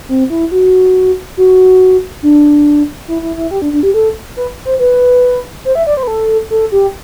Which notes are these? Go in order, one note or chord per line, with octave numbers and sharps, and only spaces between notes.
C4
E4
F#4
F#4
D4
E4
E4
E4
G4
D4
D4
G4
A4
B4
C5
B4
C5
E5
D5
C5
B4
A4
A4
G4